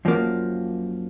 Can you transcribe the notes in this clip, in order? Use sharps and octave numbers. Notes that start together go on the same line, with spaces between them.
F#2 F3 A#3